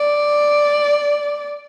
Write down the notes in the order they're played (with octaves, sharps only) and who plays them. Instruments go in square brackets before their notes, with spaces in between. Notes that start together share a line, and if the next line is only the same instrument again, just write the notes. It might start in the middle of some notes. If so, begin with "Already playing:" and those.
Already playing: [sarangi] D5